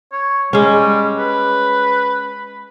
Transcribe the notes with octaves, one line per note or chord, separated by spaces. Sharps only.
C#5
G3 G#3 C#4
B4